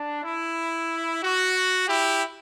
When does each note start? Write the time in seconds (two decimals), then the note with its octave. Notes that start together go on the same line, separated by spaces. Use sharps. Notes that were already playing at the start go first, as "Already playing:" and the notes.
Already playing: D4
0.24 E4
1.22 F#4
1.87 E4 G4